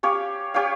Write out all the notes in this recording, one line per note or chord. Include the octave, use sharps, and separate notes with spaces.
C#4 G4 C#5 F5
C#4 G4 C#5 F5